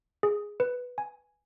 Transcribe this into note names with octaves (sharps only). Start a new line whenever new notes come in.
G#4
B4
G#5